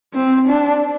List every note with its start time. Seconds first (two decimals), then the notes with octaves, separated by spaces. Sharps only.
0.14 C4
0.48 D4